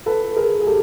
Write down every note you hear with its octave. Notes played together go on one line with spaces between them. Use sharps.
A4 B4
G#4 A#4
G#4
G4 A4